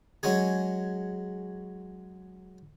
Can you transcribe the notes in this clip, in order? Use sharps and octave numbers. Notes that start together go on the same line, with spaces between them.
F#3 G#3 C#4 G#4